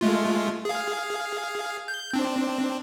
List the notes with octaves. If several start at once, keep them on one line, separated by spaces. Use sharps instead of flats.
G#3 A3 F4
G#4 F5
G6
C4 D4